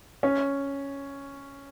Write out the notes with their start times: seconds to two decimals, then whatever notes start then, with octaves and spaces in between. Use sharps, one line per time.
0.23 C#4